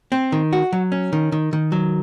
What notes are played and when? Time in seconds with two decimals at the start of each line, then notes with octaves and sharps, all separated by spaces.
0.12 C4
0.32 D#3
0.53 F#4
0.73 F#3
0.92 C#4
1.13 D#3
1.32 D#3
1.53 D#3
1.72 F#3